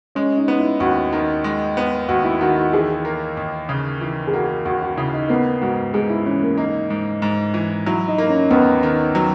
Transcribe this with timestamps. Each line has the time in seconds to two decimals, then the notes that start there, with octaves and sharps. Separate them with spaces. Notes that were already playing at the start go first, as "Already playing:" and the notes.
0.15 G#3 C#4
0.37 D#4
0.48 B3
0.59 E4
0.80 D#2 F#4
1.13 D#3
1.44 G#3
1.77 B3
2.08 D#2 F#4
2.24 E4
2.41 D#3 F#4
2.57 F#4
2.73 E3 G#4
3.05 A#3
3.37 D#2
3.69 C#3
4.01 E3
4.27 G#4
4.33 A#3 F#4
4.65 D#2 F#4
4.82 F#4
4.97 C#3 E4
5.13 D#4
5.29 A#3 B3
5.61 G#2 F#4
5.94 G#2 G#4
6.10 E4
6.26 E3 C#4
6.43 A#3
6.58 A#3 D#4
6.90 G#2
7.22 G#2
7.54 E3
7.86 F#3 E4
8.08 D#4
8.18 A#3
8.29 C#4
8.51 D#2 B3
8.83 D#3
9.15 F#3